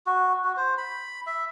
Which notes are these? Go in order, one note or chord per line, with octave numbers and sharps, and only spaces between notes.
F#4
F#4
C5
B5
E5